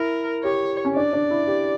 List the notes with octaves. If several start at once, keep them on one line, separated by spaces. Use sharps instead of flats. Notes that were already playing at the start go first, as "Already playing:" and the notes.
Already playing: E4 A#4
G4 C#5
C#4
D4 D5
D4
E4
G4